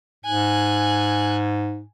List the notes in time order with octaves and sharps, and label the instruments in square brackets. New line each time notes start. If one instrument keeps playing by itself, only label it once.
[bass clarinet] G#2 [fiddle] G#5 F#6